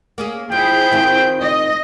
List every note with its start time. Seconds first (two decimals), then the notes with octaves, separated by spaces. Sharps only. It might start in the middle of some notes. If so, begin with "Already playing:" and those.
0.18 A#3 C#4 G#4
0.52 F3 E4 G#4 G5
0.92 D#3 C4 F4
1.41 D#5